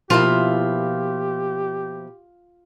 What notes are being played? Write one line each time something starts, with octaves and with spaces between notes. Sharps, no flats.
B2 F3 A#3 E4 F4 G4 E5